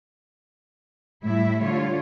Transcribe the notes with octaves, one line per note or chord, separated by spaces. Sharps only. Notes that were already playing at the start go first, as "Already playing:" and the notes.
A2 G3 E4 E5
D3 G3 F4 C#5